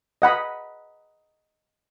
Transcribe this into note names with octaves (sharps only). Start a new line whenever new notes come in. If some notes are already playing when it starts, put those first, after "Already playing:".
D#5 F#5 B5 D#6